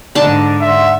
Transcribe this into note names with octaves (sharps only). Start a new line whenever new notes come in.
G#2 D3 D4 A5
E5 F#5 C6